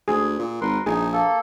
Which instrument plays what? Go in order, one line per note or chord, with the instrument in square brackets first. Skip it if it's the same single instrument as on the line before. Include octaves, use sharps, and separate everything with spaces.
[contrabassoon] D2 [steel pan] G#4
[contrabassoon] A#2
[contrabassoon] G#1 [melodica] A#4 B4 C6
[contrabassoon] A#1 [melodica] D#4 [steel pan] G#4
[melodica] A#3 A4